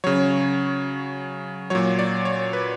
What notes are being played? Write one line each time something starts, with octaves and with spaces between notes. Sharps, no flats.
C#3 F#3 C#5
A#2 F#3 C#5
D5
C#5
B4